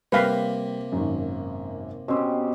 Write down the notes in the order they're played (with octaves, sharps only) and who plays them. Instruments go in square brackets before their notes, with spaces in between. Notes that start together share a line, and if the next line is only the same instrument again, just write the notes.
[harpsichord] C3 A#3 [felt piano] G3 G5 B6 [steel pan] B4 F5
[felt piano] G#1 F#2
[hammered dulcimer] B2 C4 G4 [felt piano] C#4